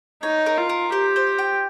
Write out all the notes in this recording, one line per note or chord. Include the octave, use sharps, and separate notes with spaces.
D#4 C#5
A#4
F4
A#4
G4 C5
C5
G5